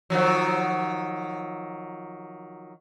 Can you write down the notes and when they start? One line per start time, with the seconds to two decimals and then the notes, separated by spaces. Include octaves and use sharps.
0.10 D#3 F3 F#3